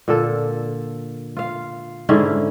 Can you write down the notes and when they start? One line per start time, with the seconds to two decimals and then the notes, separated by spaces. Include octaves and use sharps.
0.08 A#2 D3 A4
1.37 F4 F5
2.09 G#2 D3 C#4 E4